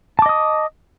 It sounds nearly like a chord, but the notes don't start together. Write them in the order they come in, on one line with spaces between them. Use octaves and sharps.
A5 D6 D#5 D#6